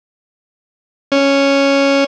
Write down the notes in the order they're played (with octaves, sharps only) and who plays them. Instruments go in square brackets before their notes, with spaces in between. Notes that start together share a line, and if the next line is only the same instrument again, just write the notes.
[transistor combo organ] C#4